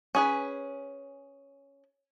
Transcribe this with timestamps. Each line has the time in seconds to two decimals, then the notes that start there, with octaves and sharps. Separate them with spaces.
0.15 C#4 G#4 B4